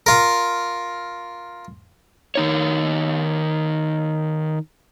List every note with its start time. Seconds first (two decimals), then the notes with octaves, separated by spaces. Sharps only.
0.06 F4 A#4
2.35 D#3 D#4 C#5